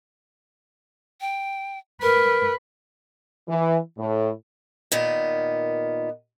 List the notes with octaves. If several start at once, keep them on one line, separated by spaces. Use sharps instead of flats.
G5
A#4 B4
E3
A2
A#2 D#3 B3